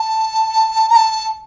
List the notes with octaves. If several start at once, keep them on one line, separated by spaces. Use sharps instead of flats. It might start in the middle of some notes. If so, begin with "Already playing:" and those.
Already playing: A5
A#5
A5